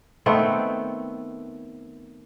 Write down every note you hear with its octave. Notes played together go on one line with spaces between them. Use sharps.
D#3 A3 B3 C4